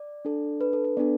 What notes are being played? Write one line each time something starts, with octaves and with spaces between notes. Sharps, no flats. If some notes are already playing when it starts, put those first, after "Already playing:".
Already playing: D5
D4 A4
B4
A4
B4
B3 D4 A4 D5